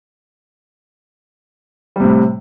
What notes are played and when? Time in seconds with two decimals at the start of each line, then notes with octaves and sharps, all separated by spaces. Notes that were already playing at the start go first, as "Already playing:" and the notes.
1.96 G3
2.00 C3
2.04 A2